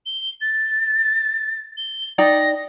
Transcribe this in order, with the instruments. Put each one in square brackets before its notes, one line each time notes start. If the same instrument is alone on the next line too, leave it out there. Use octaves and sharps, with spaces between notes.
[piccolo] G7
A6
G7
[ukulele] D#4 D5 G5 [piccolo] A#6